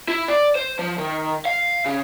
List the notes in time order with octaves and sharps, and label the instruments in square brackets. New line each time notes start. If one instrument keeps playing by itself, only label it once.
[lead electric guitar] E4
D5
C5
F3
D#3
F5
C#3